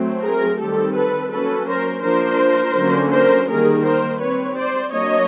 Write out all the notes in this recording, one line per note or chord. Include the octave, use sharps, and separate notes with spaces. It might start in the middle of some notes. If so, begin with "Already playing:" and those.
Already playing: F#3 A3 C4
G#4 A#4
D#3 G3 C4 G4 A4
A4 B4
F#3 A#3 C#4 A4 B4
A#4 C5
F3 A#3 D4 A#4 C5
D3 F#3 A#3 C#4
A#4 C5
D#3 G3 A#3 G#4 A#4
A#4 C5
G3 C4 B4 C#5
C5 D5
F#3 A#3 D4 C#5 D#5